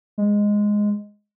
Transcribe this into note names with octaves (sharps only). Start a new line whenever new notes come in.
G#3